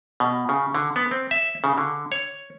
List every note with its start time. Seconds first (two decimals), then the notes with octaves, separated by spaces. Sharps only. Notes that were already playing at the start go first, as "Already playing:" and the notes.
0.20 B2
0.49 C#3
0.75 D3
0.96 B3
1.11 C4
1.31 E5
1.64 C#3
1.78 D3
2.12 C#5